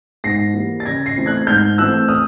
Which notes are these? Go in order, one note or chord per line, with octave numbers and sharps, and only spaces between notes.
G#2 A#6 C7
E3 G3 A#3
A6
C#3 G#6 A#6
A#6 C7
E3 A3 C4
F#6 G#6
G#2 F6 G6
E3 A3 C4 E6 F#6
D#6 F6